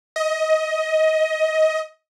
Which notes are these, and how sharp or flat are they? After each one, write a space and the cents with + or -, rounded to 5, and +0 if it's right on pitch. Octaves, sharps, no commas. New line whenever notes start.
D#5 +20